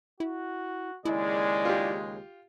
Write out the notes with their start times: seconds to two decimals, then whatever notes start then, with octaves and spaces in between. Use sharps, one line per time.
0.20 E4 F#4
1.05 D#2 C#3 G#3 E4 D5
1.65 F4 G4